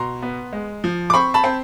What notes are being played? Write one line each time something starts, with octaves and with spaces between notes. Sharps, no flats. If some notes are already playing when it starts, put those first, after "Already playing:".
Already playing: B2 A#5 C6
B3
G#3
F3
D6
C4 B5 C#6
A5 B5
C4